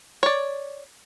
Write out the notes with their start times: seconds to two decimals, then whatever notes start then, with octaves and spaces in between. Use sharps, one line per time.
0.23 C#5 D5